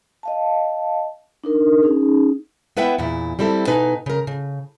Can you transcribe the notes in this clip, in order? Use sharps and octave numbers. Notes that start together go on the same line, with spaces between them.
D#5 F5 A5
D4 D#4 A#4
C#4 D#4 G#4
B3 E4 B4 E5 F#5 G5
E2 A#2 E4
G3 C4 E4 A4
B2 D#4 B4 G#5
C#3 A#4
C#3